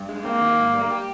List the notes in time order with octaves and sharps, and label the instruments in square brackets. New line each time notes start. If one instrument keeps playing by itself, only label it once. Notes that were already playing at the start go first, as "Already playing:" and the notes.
Already playing: [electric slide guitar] G2
G#3
[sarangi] A#3 [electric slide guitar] C4
[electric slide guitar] D#3
G#2
G3
G4